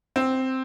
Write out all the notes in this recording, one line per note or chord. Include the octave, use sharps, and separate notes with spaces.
C4